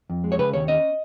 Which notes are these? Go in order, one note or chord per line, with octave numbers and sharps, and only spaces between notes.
F2
G#3
C#5
C#3 B4
D#2 C#5
C#4 D#5